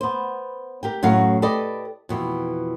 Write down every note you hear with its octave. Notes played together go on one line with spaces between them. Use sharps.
B3 C5
G4 A#4 G5
F#2 A2 F#3 F#4 F5
G4 A4 B4 D5 D#5
F2 B2 E3